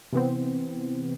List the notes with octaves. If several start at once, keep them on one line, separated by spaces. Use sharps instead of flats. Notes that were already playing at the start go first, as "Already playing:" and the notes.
C3 E3 B3 C4